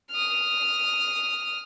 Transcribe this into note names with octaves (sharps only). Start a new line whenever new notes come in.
D#6 F6